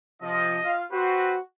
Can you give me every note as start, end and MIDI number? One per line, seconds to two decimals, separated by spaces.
0.22 0.58 48
0.22 0.58 53
0.22 0.74 75
0.64 0.83 65
0.64 0.83 77
0.92 1.37 60
0.92 1.38 66
0.92 1.37 71
0.92 1.37 72